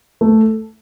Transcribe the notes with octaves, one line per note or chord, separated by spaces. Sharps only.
A3